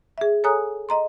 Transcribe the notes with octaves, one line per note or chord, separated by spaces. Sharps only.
G#4 E5
A4 C#5 G#5 A#5 D#6 F#6
D#5 A#5 C6